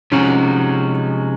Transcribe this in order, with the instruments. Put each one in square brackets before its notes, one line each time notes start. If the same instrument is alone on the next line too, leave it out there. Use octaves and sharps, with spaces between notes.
[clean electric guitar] C3 F3 G#3 D#4 F#4 [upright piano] C#4